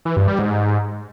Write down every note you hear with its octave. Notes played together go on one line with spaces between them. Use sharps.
E3
G2
G3
G#2